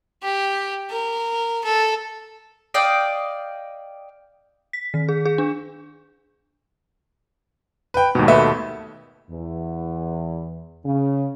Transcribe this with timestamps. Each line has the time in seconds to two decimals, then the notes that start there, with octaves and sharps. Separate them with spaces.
0.23 G4
0.90 A#4
1.64 A4
2.74 D5 D#5 F5 G5
4.73 B6
4.94 D#3
5.09 G#4
5.26 G#4
5.38 D4
7.94 B4 G5
8.15 D#2 G#2 B2
8.28 A3 B4 E5
9.30 E2
10.84 C#3